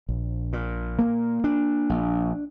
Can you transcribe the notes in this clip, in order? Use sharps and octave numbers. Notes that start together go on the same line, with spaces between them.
A#1
A#2
A#3
D4
A#1